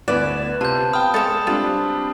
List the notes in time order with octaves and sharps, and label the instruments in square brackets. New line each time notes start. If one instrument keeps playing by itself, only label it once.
[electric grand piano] D2 E4 F#6 [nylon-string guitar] B3 [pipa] D5 [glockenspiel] E7
[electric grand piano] C3 [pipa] F4 [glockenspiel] A5 G6
[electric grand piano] F5 G5 [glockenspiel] B5 D#6 F6
[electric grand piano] G#3 [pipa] A4 C#5 E5 [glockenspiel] D#6
[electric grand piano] G3 C4 D4 [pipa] F4